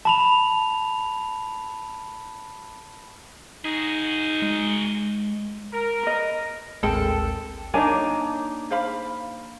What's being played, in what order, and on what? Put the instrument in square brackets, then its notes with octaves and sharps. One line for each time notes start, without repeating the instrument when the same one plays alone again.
[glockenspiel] A5 B5 F7
[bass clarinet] D#4 [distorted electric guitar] F#4 G#4
[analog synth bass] G#3
[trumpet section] A#4
[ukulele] B4 D#5
[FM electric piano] A1 D#2 [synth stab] G#3 [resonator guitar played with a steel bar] C4 A#4 G5 [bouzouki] A4
[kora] A#3 D4 D#4 [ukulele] C#5 G#5 A#5
[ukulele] C5 F5 B5